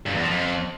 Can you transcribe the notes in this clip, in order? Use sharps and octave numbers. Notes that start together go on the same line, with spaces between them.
G2
E2
F3
F2